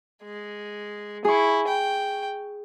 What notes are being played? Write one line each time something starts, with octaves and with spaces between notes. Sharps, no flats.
G#3
E4 G#4 C#6
G5